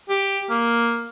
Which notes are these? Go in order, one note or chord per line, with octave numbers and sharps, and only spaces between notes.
G4
A#3